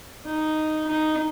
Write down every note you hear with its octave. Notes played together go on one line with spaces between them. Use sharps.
D#4
D#4